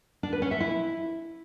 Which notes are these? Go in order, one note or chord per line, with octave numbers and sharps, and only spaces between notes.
D4
B4
C#4
E5
E4